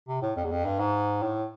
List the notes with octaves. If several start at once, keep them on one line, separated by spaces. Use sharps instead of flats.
C3
A2
F2
E2
F2
G2
G#2
A2